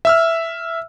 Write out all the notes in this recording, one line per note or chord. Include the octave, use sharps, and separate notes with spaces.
E5 E6 F6